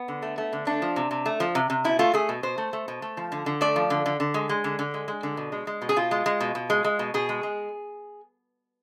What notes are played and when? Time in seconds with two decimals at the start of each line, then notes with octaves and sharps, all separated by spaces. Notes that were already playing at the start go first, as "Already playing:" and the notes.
Already playing: B3
0.08 D3
0.22 A3
0.38 A3
0.53 D3
0.67 A3 D4
0.82 F3
0.96 C3
1.11 C3
1.26 A3
1.40 F3
1.55 C3
1.70 C3
1.84 B2 E4
1.99 A3 F4
2.14 A3 G#4
2.29 B2
2.43 B2 C5
2.58 A3
2.73 A3
2.88 B2
3.02 A3
3.17 F3
3.32 D3
3.46 D3
3.61 A3 D5
3.76 F3
3.90 D3
4.06 D3
4.20 D3
4.34 G#3
4.49 G#3
4.64 D3
4.79 D3
4.94 G#3
5.08 G#3
5.23 D3
5.37 B2
5.52 G#3
5.67 G#3
5.82 B2
5.89 G#4
5.96 B2 F4
6.11 G#3
6.26 G#3
6.41 B2
6.55 B2
6.70 G#3
6.85 G#3
6.99 B2
7.14 B2 G#4
7.29 G#3
7.43 G#3